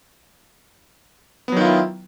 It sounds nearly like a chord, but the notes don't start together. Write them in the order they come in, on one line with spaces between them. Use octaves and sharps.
B3 F#3 D#3 F4 E4